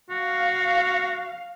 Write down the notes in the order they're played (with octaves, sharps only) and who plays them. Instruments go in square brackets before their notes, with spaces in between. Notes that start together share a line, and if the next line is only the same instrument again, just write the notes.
[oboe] F#4 [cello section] F5